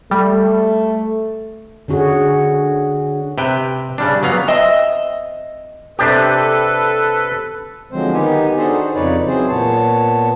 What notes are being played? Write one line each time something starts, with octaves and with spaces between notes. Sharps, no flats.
G3 A3
D3 C#4 F#4 G#4
C3 B4 G5
C#3 G3 D4
F#3 B3 F5
C4 D#5 E5
C3 D4 G4 A4 B4
D3 F3 F#3 G#3 C4 C5
D#3 B3 D#4 G4 G#5
D4 D#4 F#4 G#4 A4 C5
F2 C#3 D#4 B4 C#5 D5
E3 F#3 C4 G#4 C5
A#2 B3 C#5 A5